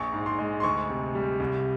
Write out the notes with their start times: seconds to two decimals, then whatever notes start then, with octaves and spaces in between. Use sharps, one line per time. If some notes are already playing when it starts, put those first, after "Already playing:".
Already playing: A#1 C#6
0.13 G#2
0.26 C6
0.38 G#3
0.60 C6
0.63 D2 C#6
0.89 C3
1.15 G3
1.40 C2